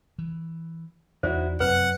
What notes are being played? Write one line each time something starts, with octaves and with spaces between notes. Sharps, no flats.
E3
E2 D#4 E4 F#4 C5 D5
F1 F#2 C4 B4 F#5